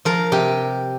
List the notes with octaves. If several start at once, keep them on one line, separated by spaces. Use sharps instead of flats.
F3 A#4
C3 G4